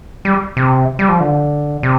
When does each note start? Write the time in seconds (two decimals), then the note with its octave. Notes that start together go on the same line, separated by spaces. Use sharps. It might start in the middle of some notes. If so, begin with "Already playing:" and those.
0.25 G3
0.57 C3
0.99 G3
1.09 F3
1.20 D3
1.83 C3